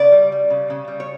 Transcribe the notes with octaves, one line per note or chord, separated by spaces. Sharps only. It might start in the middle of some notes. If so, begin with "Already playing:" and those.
Already playing: C#3 D5
G3
G3
C#3
C#3
G3
C#5